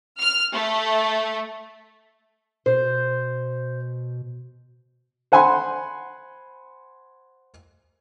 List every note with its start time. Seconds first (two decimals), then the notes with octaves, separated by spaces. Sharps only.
0.19 F6
0.53 A3
2.66 B2 C5
5.32 C5 F#5 G#5 B5 C6